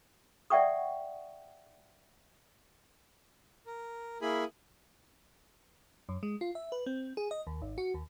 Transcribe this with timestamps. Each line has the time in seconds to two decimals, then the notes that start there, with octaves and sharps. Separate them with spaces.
0.50 D5 E5 F#5 G5 C#6 D#6
3.66 A#4
4.22 A#3 E4 G#4 G#5 B5
6.09 F#2
6.23 G#3
6.41 F4
6.55 E5
6.72 B4
6.86 C4
7.17 G#4
7.31 D#5
7.47 D#2
7.62 G#1
7.78 F#4
7.94 D#2